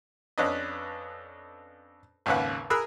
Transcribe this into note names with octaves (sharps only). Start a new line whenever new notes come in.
F2 C#4 D4 B4 D#5
G#1 D#2 C#3 B4 F#5
G#4 A#4 B5 E6 F#6